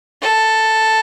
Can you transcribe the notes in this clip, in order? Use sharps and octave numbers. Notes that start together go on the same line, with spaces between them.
A4